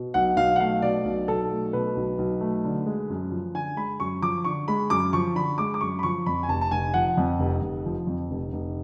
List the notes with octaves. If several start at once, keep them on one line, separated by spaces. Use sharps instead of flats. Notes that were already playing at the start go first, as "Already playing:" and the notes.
Already playing: B2
B1 F#5
B1 F5
F#5
A3 F5
B2 D5
B1
B1 A4
A3
B2 B4
B1
B1
A3
D3
G#3
F#2
F3
D3 G#5
G#3 B5
F#2 C#6
F3 D6
D3 C#6
G#3 B5
F#2 D6
F3 C#6
D3 B5
G#3 D6
D6
F#2 C#6
B5
F3 C#6
F2 B5
G#5
F1 A5
A5
F1 G#5
F3 F#5
F2
F1
F1
F3
F2
F1
F1